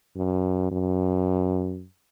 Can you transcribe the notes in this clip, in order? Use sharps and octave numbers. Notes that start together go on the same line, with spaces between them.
F#2
F#2